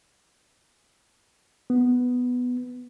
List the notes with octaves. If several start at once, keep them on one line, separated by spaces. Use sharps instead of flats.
B3